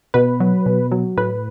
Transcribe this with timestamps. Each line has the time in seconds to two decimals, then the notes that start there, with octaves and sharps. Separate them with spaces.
0.14 B2 B4
0.40 F#3
0.66 B2
0.92 F#3
1.17 A2 B4